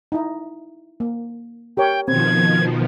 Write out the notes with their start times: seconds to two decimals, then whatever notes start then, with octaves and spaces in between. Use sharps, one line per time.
0.12 D#4 E4
1.00 A#3
1.77 G4 A#4 C#5 G5
2.08 B2 D#3 F3 C4 G#6